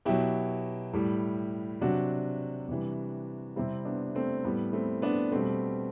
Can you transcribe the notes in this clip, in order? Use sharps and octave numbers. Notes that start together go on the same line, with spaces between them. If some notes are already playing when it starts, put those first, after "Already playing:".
B2 F#3 E4 G4
A2 G3
C3 F#3 D4 F#4
C3 E3 G3
C3 G3 C4 E4
B3 D4
A3 C4
A2 G3 B3
A3 C4
B3 D4
B2 G3 A3 C4